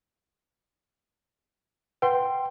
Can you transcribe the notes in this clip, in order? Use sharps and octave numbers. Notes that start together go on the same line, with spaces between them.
B4 F#5 G5 C6